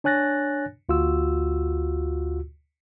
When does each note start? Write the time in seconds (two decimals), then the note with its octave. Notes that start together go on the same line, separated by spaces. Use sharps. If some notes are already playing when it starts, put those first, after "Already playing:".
0.04 D4 C#5 G#5 F#6 A6 A#6
0.89 D2 F4 F#4 E6